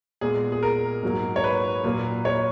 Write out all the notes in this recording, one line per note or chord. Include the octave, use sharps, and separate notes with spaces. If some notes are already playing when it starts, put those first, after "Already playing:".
A#2 G#3 B3 G#4
G#4
A#4
G#2 F#3 A#3
C#5
B4
A#2 F#3 A#3
C#5